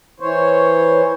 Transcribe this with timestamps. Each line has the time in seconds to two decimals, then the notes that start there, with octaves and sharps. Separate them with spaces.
0.20 E3 C5 C#5